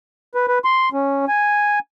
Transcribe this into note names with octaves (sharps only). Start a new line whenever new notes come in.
B4
B4
C6
C#4
G#5